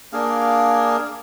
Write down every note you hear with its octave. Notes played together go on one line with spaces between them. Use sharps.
A#3 D4 G#4 F5